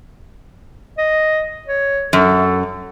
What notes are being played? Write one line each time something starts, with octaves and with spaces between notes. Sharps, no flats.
D#5
C#5
F#2 A4